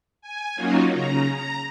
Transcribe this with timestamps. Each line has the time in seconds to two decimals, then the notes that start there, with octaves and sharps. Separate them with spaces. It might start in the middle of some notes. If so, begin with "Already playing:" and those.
0.22 G#5
0.56 F#3 A#3 C#4 D#4 F4 F#4
0.91 C#3 A#5
1.34 A#5